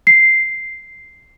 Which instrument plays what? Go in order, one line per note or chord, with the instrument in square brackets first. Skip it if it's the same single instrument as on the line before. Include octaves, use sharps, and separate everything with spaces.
[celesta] C7